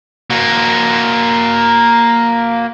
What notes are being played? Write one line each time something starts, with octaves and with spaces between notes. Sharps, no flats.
A#3 F#4